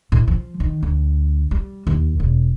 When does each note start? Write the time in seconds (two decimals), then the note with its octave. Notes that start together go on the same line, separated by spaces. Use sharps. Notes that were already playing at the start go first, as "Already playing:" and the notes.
0.12 A2
0.28 F3
0.60 D#3
0.83 D2
1.51 G3
1.87 D#2
2.20 E1